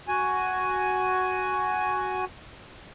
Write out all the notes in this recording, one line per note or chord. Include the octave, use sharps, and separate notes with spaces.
F#4 G#5